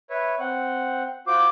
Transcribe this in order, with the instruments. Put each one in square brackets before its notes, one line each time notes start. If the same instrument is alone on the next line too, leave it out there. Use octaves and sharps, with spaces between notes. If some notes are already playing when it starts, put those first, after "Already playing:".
[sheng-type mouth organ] B4 C#5 E5
C4 F#5
[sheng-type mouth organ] F4 F#4 C5 [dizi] D6